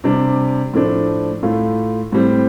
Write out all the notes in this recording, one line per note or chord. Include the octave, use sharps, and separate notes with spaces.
C3 G3 D4
A2 F3 A3 D4
A2 A3 F4
A2 G3 C4